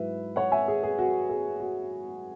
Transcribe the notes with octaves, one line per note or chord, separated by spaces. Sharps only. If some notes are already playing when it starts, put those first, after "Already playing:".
Already playing: G#2 F#3 E4 B4 E5
C#5 F#5
E5 G#5
G#4
G#4
F#4
G#4
F#4